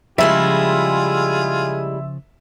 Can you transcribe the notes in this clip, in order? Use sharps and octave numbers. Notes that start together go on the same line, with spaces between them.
C#3 F3 G3 G#3 E4 F4 G#4 E5